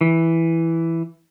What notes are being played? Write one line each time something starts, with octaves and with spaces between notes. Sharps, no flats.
E3